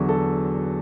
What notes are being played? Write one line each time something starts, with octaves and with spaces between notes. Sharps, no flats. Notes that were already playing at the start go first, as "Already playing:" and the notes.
Already playing: E2 D3 F#3 F#4
A4